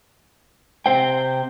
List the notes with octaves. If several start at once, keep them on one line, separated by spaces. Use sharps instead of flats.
C3 C5 G5